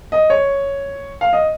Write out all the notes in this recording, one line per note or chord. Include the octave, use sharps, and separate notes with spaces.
D#5
C#5
F5
D#5